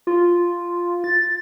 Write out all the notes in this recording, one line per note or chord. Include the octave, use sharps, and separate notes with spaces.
F4
A6